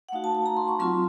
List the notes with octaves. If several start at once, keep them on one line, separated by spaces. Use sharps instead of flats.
F#5
A3 D#4 F#4 F5
A5
A5
A#5
C6
C#6
F#3 C4 F4 C6